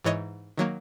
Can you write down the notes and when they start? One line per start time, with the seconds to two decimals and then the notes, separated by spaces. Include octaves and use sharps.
0.04 G#2 E3 C#5 D#5
0.58 D#3 F#3 A#3